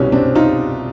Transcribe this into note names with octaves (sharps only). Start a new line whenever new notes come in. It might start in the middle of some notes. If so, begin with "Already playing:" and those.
Already playing: C2 B2 G3 C#4
C4 D4
D#4 F4